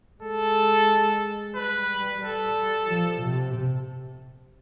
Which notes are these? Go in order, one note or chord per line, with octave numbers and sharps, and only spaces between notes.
G#3 A4
G3 B4
A4
F3
C3